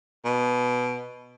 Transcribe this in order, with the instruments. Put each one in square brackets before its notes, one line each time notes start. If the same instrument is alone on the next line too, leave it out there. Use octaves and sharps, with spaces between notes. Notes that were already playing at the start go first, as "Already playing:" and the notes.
[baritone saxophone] B2